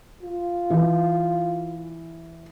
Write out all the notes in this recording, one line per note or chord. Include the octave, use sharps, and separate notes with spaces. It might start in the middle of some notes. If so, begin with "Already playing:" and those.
F4
E3